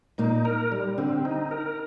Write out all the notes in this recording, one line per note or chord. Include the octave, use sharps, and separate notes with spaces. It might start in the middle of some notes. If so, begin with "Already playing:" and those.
A#2 A#3 D#4
A#4
G3
D3 C4 D4
D#4
A#4